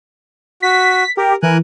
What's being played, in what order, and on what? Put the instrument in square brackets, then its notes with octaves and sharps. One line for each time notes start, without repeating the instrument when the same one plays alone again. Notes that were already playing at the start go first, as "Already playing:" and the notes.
[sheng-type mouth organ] F#4 [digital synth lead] B6
[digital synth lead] G4 [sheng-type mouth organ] A#4
[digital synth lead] E3 [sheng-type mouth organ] A#4 G#5 F#6